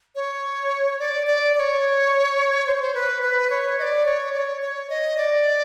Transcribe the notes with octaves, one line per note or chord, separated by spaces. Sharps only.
C#5
D5
D5
D5
C#5
C5
C#5
C5
B4
B4
C#5
D#5
D5
C#5
D5
C#5
C#5
D#5
D5